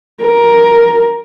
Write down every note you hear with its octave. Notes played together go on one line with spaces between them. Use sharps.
A#4